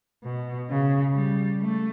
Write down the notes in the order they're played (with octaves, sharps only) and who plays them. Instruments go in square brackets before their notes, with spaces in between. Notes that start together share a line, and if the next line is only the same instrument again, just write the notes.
[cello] B2
C#3
G3
A3